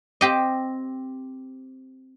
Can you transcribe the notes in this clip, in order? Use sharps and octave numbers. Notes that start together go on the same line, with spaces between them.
C4 G4 D#5